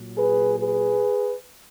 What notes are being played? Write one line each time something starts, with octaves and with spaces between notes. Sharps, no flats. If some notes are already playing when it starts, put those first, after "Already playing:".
Already playing: A#2 F#3
G#4 B4
G#4 B4